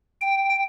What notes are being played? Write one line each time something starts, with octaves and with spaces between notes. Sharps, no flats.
G5